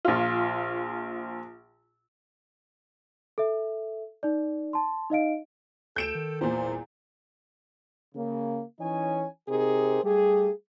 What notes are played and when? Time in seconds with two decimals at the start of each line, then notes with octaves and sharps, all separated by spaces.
0.05 A#1 F4
3.38 A4 E5
4.23 D#4 D5
4.73 A5 C6
5.10 D#4 D#5 F5 D7
5.96 D2 A4 G6 D7 E7
6.15 D#3
6.41 E2 A#2 C5
6.66 D#1
8.15 C#3 A#3
8.80 E3 C#4 D#4 C#5 G#5
9.49 C3 D#4 G4 G#4 A#4 C5
10.04 G3 A3 G4 G#4